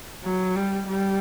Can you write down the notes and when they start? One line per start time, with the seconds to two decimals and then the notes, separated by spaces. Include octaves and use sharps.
0.23 F#3
0.55 G3
0.87 G3